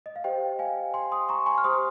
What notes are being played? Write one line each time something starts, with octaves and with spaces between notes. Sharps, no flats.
D#5
F5
G4 C5 D#5 G5
F5 G#5
G#5 C6
C6 D#6
A#5 C#6
G#5 C6
F6
G4 C5 C6 D#6